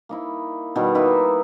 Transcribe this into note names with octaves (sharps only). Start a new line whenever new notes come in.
A#3 D#4 E4
B2 D#3 G3
A#3 D#4 E4 B4